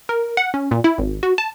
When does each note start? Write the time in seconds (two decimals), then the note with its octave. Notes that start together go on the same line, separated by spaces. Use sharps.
0.09 A#4
0.37 F#5
0.54 C#4
0.71 A#2
0.84 E4
0.98 G#1
1.23 F#4
1.38 A5